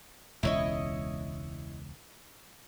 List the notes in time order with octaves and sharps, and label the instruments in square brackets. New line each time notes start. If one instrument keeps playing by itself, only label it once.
[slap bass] E1 C#2 C#3 [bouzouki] E4 C#5 D#5